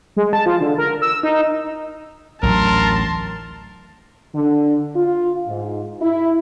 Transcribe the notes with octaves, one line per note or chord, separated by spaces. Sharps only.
G#3
A5
F3
D3
A#4
E6
D#4
A1 D2 F#3 A#4 A5 C6
D3
F4
G#2
E4